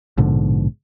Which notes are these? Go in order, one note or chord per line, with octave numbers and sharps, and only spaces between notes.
A#1 G#2 B2 D3